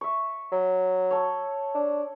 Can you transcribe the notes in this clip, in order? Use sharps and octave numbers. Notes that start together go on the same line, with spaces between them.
E5 C#6
F#3
A4 C#5
D4